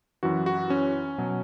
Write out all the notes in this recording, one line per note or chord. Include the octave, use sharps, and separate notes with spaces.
F#2 E3 F#4
F#4
C#4
B2 F#3